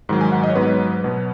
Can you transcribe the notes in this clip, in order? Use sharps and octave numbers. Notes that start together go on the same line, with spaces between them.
G#2 D#3 F#3
G#5
F#5
D#5
C#5
G#2 F#3 B3 B4
B2 F#3 B3